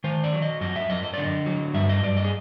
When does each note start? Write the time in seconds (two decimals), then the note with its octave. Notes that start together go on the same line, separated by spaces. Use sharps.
0.04 D#3 C5
0.24 D5
0.33 F#3
0.42 D#5
0.61 F#2 D#5
0.76 E5
0.90 F#2 D#5
1.03 D#5
1.14 D3 D5
1.24 D#5
1.46 F#3
1.74 G2 E5
1.89 D#5
2.03 G2 D5
2.17 D#5
2.25 G#4